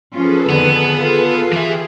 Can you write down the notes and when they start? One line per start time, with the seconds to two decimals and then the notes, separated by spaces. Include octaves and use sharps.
0.14 F3 C#4 F4 G#4 A4 B4
0.50 F2 D3 D#3 B3
0.98 F4
1.53 E3 G4 G#4 E5